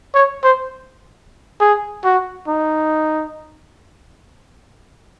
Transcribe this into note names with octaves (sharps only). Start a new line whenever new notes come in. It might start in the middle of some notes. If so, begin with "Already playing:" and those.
C#5
C5
G#4
F#4
D#4